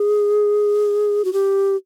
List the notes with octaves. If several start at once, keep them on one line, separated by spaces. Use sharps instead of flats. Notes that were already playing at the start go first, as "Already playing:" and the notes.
Already playing: G#4
F#4
G4